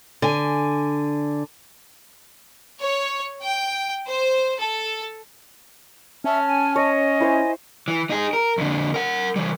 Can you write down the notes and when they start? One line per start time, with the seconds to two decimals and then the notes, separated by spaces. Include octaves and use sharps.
0.22 D3 G#5
2.80 C#5
3.42 G5
4.07 C5
4.60 A4
6.24 C#4 E5 A5 F6
6.47 G#5
6.76 C#5 D#5
7.21 E4 C5 G#5
7.88 E3
8.10 D#4 G#4
8.33 A#4
8.58 F2 D3
8.94 A#4 F#5
9.36 E3 G3